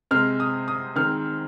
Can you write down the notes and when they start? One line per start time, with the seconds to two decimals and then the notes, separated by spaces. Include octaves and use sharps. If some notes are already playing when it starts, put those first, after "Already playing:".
0.11 C3 G#3 C4 F6
0.40 D#6
0.68 D#6
0.96 D#3 G#3 C4 F6